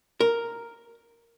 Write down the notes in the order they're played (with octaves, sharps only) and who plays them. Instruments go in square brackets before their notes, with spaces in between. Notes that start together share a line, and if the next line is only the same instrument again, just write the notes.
[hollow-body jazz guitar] A#4